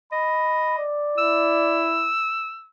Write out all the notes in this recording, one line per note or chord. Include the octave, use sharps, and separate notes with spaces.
D#5 B5
D5
E4 E6